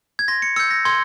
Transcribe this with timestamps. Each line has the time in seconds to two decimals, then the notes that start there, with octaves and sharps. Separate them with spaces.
0.19 G#6
0.28 C6 A#6
0.42 C#7
0.56 E6 G6 C#7
0.71 A#6
0.85 C6 G#6